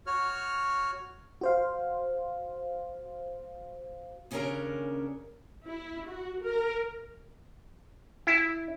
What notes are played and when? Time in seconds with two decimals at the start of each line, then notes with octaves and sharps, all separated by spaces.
0.07 F#4 C#5 F6
1.41 F#4 C5 F5
4.31 D#2 C#3 C#4 D4 A#4 A#5
5.67 E4
6.09 F#4
6.44 A#4
8.27 E4